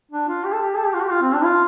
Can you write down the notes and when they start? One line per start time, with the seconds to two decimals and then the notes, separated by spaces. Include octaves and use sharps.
0.11 D4
0.28 F4
0.44 G4
0.52 A4
0.62 G4
0.77 A4
0.86 G4
0.94 F4
1.02 G4
1.11 F4
1.22 C4
1.33 D4
1.44 F4